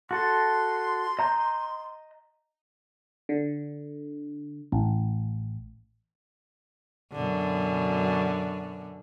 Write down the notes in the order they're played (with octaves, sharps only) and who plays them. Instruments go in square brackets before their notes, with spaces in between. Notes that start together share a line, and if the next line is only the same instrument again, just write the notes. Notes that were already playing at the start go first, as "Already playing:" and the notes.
[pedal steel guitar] F#4 A4 [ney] C6
[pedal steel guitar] D#5 A#5 G6
[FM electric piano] D3
A1
[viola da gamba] F#2 B2 D3